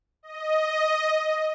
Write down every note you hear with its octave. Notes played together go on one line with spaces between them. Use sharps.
D#5